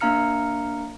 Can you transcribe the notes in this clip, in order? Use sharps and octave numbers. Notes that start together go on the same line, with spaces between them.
A#3 D4 F5 A#5 F6 C#7